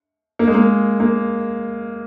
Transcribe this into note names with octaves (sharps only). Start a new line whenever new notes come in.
A#3
G#3
A#3
A#3